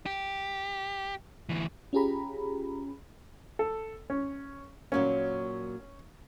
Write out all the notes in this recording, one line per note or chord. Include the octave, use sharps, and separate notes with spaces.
G4
D2 E3
C#4 F4 G4 G#4 A#5 B5
A4
C#4
A#2 F#3 A#3 C#4